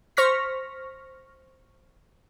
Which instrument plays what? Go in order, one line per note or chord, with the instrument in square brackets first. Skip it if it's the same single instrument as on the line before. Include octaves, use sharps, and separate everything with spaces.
[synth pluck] C5 C#6 F6 A#6 B6